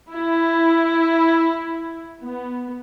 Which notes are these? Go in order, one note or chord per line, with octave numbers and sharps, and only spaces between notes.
E4
B3